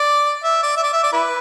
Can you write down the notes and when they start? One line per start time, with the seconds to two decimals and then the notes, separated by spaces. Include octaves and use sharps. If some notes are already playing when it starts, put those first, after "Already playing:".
Already playing: D5
0.43 E5
0.63 D5
0.77 E5
0.83 D5
0.93 E5
1.03 D5
1.12 E4 B4